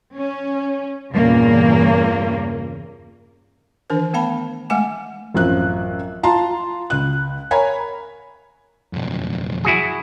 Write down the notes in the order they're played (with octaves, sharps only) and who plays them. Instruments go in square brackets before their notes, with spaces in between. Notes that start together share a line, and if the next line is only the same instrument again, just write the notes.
[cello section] C#4
E2 G2 A#2 C#3 A#3
[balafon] D#3 E3 D4 A#4 C5
A3 B3 F5 A5 B5
G#3 A3 F#5 G#5 D6
[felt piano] A1 F#2 F3 C4 F#6
F4 A5 A#5 C6
C#2 F#6
A#4 C#5 G#5 A#5 B5
[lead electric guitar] B1 F2
[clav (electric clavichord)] E4 F#4 G#4